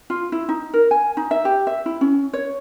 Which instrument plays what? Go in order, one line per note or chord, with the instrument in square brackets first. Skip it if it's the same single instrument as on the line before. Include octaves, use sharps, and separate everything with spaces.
[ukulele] F4
E4
D#4
A#4
G#5
D#4
E5
G4
E5
E4
C#4
C#5